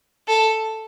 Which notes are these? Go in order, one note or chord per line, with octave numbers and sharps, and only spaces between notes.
A4